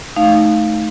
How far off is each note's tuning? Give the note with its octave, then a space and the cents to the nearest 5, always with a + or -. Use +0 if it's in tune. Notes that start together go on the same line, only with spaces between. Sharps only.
A3 -15 D#4 +0 F5 +0